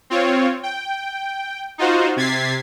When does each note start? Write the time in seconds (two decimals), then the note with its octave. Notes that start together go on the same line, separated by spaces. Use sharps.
0.10 C4 F4 C#5
0.63 G5
1.78 D#4 F4 F#4 C5
2.16 C3 G#6 A6 B6 C7